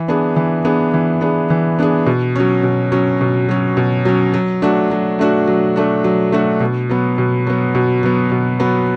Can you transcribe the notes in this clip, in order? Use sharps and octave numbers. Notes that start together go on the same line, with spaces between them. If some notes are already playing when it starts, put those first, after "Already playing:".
Already playing: E3
B3 D4 G#4
E3
B3 D4 G#4
E3
B3 D4 G#4
E3
B3 D4 G#4
B2
F#3 C#4
B2
F#3 C#4
B2
F#3 C#4
B2
F#3 C#4
F#3
A3 D4 F#4
F#3
A3 D4 F#4
F#3
A3 D4 F#4
F#3
A3 D4 F#4
B2
F#3 B3
B2
F#3 B3
B2
F#3 B3
B2
F#3 B3